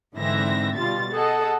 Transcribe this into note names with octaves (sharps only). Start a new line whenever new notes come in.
G#2 D3 E3 C4 E5 A#6
B2 G3 F4 A6
G#4 A4 D#5 F#5 A5